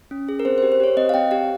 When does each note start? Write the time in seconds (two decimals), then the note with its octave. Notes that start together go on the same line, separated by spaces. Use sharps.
0.11 C#4
0.29 G#4
0.39 A#4
0.45 C4 C5
0.58 C5
0.62 G4
0.72 C5
0.80 G4 C#5
0.97 C4 D#5
1.09 F5
1.14 C4 G5
1.31 G4 F5